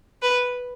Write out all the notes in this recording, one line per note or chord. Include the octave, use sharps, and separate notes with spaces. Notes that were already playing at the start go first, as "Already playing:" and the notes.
B4